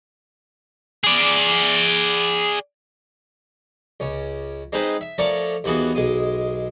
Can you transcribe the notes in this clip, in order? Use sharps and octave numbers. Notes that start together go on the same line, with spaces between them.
G#4 D5
C#2 C#4
G#3 C4 D#4 G#4 B4 C5
E5
F3 A3 C#4 A#4 C#5 D5
D#2 E3 B3 F#4 G#4
B1 G#3 D#6